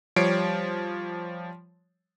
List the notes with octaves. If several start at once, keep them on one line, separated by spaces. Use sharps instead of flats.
F3 G3 C#5 C7 D7